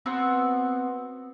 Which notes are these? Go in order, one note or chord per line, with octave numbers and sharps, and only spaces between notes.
B3 C4 F#4